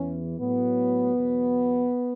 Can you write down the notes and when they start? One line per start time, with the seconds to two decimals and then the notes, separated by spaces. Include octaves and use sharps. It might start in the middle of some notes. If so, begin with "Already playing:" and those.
Already playing: E2 E3 C#4
0.40 A2 F#3 B3
1.15 E2 B2 F#3